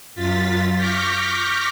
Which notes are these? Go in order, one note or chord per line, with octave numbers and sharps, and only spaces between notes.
F#2 F4 A6 B6
C#6 D6 F6 G6 A#6 B6